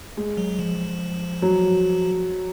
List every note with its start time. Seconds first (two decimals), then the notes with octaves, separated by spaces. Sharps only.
0.17 G#3
0.37 F#3
0.59 F3
1.42 F#3